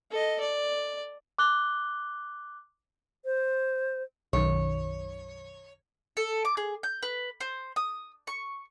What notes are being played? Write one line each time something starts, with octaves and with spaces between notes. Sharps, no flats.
A4 D#5
D5
D6 F#6 G7
C5
B1 F#2 D#3 C#5
A4
D6
G#4
G6
B4
C5
D#6
C#6